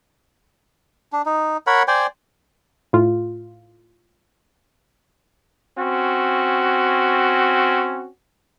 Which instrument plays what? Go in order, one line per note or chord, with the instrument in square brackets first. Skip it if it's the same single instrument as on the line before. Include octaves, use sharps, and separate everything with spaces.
[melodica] D4
D#4
A#4 C#5 F#5 B5
C5 D5 G5 G#5
[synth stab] A2 F4
[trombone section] C4 C#4 F#4